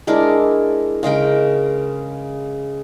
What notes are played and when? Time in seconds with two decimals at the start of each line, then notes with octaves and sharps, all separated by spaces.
0.07 G#3 D4 E4 A#4
1.03 C#3 G#3 A#4 G5